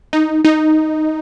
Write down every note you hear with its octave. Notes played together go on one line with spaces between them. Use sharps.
D#4
D#4